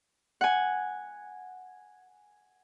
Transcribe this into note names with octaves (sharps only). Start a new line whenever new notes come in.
F#5 G#5